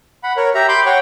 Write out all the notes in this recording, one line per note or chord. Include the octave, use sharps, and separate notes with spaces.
F#5 B5
A#4 C#5
G4 E5 A#5
B5 C6 D6 G6
C#5 F#5 G5 C#6